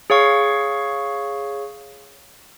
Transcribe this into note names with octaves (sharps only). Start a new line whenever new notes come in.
G#4 C#5 F5 C#6